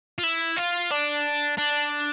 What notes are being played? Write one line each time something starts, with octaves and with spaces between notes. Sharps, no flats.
F4
E4
F4
D4
D4